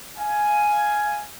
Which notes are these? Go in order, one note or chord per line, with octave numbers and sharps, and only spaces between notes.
F5 G#5